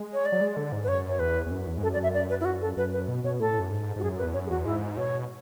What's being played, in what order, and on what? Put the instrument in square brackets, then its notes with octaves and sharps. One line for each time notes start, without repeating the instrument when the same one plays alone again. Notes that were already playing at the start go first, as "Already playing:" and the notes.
Already playing: [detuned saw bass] G#3
[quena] C#5
D5
[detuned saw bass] F#3
G#3
D3
G#2
[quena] B4
[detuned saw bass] F#2 [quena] C#5
[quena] C#5
[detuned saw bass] E2 [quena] B4
[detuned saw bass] E2
F#2
E2
G#2
[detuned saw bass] F#2 [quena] A4
[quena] D5
E5
D5
B4
E4
F#4
A4
[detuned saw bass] F#2 [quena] B4
[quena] B4
[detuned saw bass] B2
[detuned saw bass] B2 [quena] C#5
[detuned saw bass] A2 [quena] A4
[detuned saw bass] F#2
G#2
G#2
[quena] F#4
[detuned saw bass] F#2 [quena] G#4
[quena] B4
[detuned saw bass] E2
[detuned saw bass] F#2 [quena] C#5
[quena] G#4
[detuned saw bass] E2 [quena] F#4
[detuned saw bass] G#2 [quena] E4
[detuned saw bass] B2 [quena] C#5